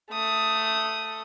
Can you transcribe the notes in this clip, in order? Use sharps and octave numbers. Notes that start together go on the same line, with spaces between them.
A3 D#6